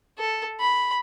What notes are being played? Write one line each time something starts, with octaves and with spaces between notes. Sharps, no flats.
A4
B5